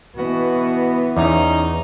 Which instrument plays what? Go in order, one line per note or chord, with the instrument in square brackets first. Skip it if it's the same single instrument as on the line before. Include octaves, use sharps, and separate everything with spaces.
[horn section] B2 F#4 [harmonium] E3 [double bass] B3
[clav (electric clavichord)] E2 [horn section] C#4 D#4